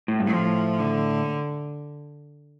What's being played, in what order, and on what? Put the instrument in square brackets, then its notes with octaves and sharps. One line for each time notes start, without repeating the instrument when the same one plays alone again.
[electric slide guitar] A2
G2
[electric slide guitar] A2 [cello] F3
[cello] D3